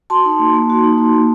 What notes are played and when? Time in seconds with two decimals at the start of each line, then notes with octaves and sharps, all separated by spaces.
0.10 F#4 A5 C6
0.25 D#4
0.40 A#3
0.54 A#3
0.70 F#4
0.84 D#4
0.98 A#3
1.14 A#3